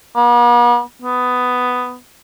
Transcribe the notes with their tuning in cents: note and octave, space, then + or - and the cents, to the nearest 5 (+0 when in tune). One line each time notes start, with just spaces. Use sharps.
B3 -45
B3 +10